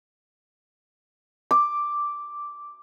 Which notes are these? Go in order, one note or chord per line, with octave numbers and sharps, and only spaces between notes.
D6